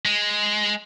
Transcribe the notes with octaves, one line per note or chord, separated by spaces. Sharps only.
G#3